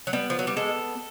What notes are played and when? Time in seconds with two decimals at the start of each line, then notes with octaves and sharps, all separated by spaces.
0.07 F#3
0.13 G3 B3
0.30 F3
0.39 F#3
0.47 G3
0.57 G#3 A4